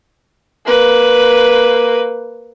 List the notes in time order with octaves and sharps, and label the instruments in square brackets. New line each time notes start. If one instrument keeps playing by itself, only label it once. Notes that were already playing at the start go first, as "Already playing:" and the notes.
[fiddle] A#3 B4